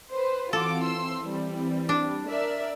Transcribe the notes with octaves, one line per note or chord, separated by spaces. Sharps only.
B4 C5
E3 C4 F4 F#4 A4 D6
C6 E6
G3
D4
A#4 D5 E5